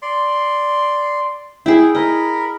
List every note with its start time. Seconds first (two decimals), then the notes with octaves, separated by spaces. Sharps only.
0.02 D5 C6
1.66 E4 G#4 G5
1.95 A#4 D#5 B5